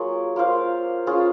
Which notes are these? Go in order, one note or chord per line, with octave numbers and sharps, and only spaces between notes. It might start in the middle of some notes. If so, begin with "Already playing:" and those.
Already playing: F#3 A#3 F4 G#4
A#3 F4 C5 F5
C#4 F4 G#4